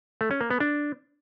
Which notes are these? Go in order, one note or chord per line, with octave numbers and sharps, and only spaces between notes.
A3
C#4
A#3
B3
D4